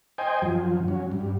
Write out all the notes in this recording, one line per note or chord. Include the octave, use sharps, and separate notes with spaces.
C5 D#5 G5 G#5
F#2 F3
F#3 C#4
G2